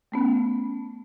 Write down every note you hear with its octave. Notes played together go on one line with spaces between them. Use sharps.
A3 B3 C#4